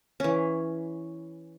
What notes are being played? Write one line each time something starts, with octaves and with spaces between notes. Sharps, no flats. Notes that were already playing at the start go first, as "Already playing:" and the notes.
E3 C#4